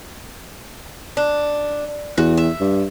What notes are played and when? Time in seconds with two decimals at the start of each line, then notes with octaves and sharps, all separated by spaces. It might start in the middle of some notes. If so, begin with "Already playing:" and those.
1.17 D4
2.18 E2 F#4
2.37 E5
2.61 G2